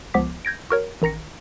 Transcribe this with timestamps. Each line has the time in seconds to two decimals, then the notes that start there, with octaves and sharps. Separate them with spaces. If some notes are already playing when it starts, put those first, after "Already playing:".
0.14 C#2 F3 B3 D6 B6
0.45 G6 G#6 A#6 D7
0.70 F#4 A#4 C#5
1.02 A1 D#3 A#5 A#6 C#7